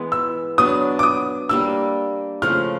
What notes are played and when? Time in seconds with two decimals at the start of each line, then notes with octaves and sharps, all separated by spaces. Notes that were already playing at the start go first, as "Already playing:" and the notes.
Already playing: E3 G#3 B3
0.12 E6
0.58 F#3 B3 D4 D#6
0.99 D6
1.03 D#6
1.49 G3 A#3 D4 E6
2.42 C#3 F3 A3 F6